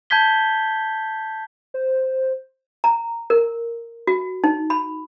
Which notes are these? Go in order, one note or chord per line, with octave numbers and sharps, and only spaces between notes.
A5 G6 G#6 B6 G7
C5
A#5
A#4
F#4
D#4
B5